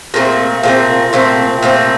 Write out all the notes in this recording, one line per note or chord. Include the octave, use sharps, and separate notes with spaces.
A#2 A3 C4
A#2 A3 C4
A#2 A3 C4
A#2 A3 C4